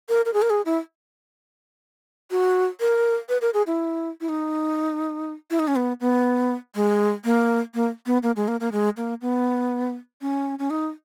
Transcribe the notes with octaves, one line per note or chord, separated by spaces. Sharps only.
A#4
A#4
G#4
A#4
G#4
E4
F#4
A#4
B4
A#4
G#4
E4
E4
D#4
E4
D#4
C#4
B3
B3
G#3
A#3
A#3
B3
A#3
G#3
A#3
A#3
G#3
A#3
B3
C#4
C#4
D#4